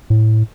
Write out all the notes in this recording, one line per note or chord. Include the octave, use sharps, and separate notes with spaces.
A2